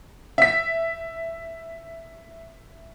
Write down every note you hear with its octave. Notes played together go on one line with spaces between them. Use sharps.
E5 B6